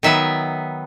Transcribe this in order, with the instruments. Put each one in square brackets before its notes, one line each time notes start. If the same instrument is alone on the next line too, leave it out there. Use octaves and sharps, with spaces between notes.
[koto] D#3 F#3 B3 E5